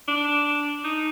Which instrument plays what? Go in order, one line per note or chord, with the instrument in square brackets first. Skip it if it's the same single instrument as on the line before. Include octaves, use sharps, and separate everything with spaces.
[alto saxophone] D4
D#4